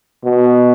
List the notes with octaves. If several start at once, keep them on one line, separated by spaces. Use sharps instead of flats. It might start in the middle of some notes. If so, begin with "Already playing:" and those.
B2